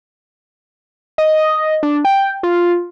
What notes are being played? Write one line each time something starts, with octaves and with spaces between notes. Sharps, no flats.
D#5
D4
G5
F4